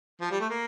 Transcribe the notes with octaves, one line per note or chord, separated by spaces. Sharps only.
F3
G3
A3
A#3